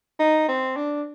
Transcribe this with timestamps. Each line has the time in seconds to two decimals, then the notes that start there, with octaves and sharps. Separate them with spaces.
0.20 D#4
0.48 C4
0.76 D4